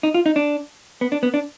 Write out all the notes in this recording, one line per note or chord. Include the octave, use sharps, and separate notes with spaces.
D#4
F4
D#4
D4
B3
D4
B3
D4